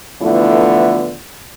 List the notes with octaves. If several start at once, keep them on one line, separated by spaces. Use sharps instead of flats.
D3 E3 F3 A3 B3 E4